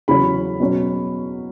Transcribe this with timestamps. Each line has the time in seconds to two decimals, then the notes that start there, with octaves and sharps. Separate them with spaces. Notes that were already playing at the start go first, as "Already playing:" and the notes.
0.08 E2 C#3 F#3 C#4 B5
0.60 B2 F#3 C#4